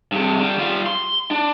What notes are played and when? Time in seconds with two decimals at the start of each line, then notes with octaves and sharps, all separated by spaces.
0.12 G2 C3
0.39 D3 G3
0.59 G3 F4
0.86 C6
1.31 D4